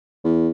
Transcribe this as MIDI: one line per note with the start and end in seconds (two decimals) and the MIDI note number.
0.24 0.49 40